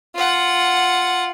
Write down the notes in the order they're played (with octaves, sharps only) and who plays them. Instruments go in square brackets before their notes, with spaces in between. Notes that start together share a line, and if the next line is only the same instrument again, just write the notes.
[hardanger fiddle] F4 F#5